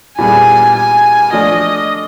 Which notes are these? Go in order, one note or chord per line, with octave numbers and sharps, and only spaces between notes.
A#2 G3 B3 E4 G#4 G#5
G#5
F3 A3 D4 F4 D#5